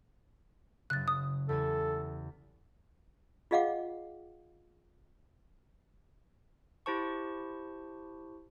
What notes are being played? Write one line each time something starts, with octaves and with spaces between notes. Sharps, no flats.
F#1 C#3 F#6 A6
D#6
E2 G4 A4 G#5
F4 G#4 D#5 F5 F#5 D6
E4 G4 C5 A5 C#6